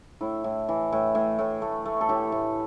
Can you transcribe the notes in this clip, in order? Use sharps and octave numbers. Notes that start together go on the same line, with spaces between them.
A2 E4
A2
E3
A2
A2
A2
A3
A3
A4
A2 G4
A2